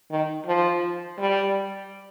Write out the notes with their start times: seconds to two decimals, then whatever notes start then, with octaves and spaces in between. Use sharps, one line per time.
0.11 D#3
0.47 F3
1.18 G3